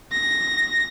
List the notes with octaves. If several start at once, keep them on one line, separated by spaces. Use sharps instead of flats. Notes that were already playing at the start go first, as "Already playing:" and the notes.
A#6